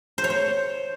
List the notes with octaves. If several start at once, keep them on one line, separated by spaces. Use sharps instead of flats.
C5
C#5
C5